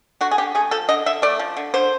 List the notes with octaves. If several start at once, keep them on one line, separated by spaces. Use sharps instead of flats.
D3 F#4
G#4
D3 G4
A3 G#4
F3 A4
D3 D#5
D3 E5
A3 D5
F3
D3
D3 C5